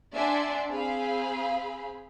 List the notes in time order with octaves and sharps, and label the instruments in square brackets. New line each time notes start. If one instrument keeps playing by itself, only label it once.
[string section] D4 D5 E5 F#5 G#5 C6
C4 G#4 C5 F5 B5